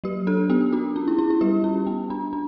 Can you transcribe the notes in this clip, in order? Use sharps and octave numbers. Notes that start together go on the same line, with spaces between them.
F#3 G4
D4 A4
B3 G4
D4 F#4
C#4
E4
C#4 E4
E4
G3 G4
C#4
B3
D4
D4